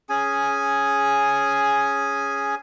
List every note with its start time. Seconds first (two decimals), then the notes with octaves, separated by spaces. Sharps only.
0.09 C#4 G#4 G#5